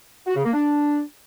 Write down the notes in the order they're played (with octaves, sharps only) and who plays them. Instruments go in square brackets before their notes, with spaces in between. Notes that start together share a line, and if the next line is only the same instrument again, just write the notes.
[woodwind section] F#4
C#3
A#3
D4